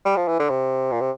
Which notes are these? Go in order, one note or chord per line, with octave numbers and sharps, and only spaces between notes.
G3
F3
E3
D3
C3
A#2
C3